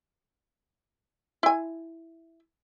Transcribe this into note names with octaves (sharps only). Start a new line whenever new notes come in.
E4 G#5